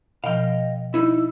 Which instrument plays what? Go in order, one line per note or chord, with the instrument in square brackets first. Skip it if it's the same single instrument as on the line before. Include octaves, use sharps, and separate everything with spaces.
[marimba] B2 F3 [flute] D#5 [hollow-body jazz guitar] F5 G5
[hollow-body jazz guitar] D#4 E4 [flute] E6